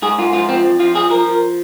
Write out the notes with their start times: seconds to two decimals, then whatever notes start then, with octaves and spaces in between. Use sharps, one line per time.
0.02 G#2 G#4
0.18 G#2 F4
0.33 F3 F4
0.49 F3 C4
0.64 F2
0.79 F3 F4
0.95 F3 G#4
1.10 F3 A#4
1.25 F3